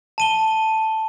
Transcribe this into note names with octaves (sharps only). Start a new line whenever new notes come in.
A5 D#7 G7